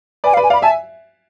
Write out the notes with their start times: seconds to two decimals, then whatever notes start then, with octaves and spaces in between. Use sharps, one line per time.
0.24 B4 D5 G#5
0.34 F5
0.37 B4 D5
0.44 G#5
0.50 D5 F5 B5
0.62 E5 G#5 A5